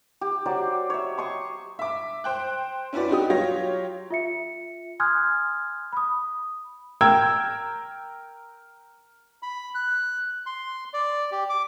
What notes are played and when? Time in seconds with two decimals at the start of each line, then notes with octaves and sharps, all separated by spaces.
0.21 G4
0.46 F#3 G4 C5 D5
0.90 C#5 E5
1.18 C6 C#6 D#6
1.79 E5 D6
2.24 C5 G5 F#6
2.93 C#4 E4 F#4 B4 D5
3.09 D#4 F#4 G4 D#6
3.30 F#3 F4 G4 C#5 A#6
4.10 F4 E5 C#7
5.00 G#5 C6 D#6 F6 F#6 G#6
5.93 B5 D#6
7.01 A#4 G5 E6 G#6
9.42 B5
9.75 F#6
10.46 C6
10.94 D5
11.32 G4
11.50 D6